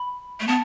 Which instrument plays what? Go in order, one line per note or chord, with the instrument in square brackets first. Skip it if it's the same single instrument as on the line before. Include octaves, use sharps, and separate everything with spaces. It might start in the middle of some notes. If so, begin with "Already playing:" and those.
Already playing: [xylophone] B5
[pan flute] A3
[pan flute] B3 [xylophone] A5